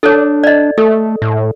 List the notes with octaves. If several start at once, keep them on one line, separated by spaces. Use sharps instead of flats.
D4 A4 C#5
D5 D#5
A3 A4
A2